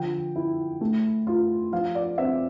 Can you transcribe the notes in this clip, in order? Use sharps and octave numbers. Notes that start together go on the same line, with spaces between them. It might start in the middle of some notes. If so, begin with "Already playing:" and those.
Already playing: D3 F3 G5
E4
A3
F4
F3 F5
D5
C4 E5